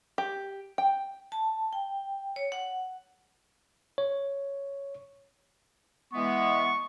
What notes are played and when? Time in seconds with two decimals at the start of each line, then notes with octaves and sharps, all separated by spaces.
0.18 G4
0.78 G5
1.32 A5
1.73 G5
2.36 C#5
2.52 F#5
3.98 C#5
6.13 E3 G#3 B3 C#6